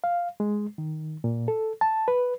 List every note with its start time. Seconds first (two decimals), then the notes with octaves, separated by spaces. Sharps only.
0.04 F5
0.40 G#3
0.78 D#3
1.24 A#2
1.48 A4
1.81 A5
2.08 B4